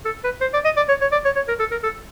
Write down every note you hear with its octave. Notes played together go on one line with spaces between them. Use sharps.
A4
B4
C5
D5
D#5
D5
C#5
C#5
D5
C#5
C#5
A#4
A4
A#4
A4